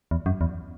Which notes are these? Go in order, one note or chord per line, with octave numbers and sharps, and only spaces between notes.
E2
F#2
E2